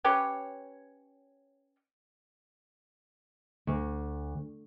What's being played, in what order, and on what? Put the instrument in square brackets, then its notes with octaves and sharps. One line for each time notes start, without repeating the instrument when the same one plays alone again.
[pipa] C#4 G4 B4 C#5
[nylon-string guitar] D2